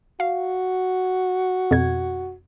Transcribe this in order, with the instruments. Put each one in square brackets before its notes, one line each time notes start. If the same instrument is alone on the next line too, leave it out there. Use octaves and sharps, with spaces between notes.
[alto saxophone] F#4 [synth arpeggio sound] F5
[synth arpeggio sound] F2 B2 G#6